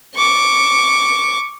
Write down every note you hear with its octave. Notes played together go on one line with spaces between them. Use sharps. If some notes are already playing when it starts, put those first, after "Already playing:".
C#6 D6